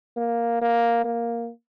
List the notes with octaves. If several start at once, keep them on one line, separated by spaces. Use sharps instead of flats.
A#3
A#3
A#3